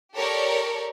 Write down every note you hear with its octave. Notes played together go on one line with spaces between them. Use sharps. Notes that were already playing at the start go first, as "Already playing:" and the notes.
G4 A4 A#4 C#5 D5